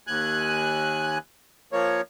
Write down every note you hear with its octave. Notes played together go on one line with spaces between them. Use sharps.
D#2 G#5 F#6
F3 A#3 C#5